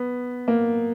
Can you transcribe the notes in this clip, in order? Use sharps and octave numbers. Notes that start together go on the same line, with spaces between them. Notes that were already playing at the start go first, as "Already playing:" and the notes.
Already playing: B3
A#3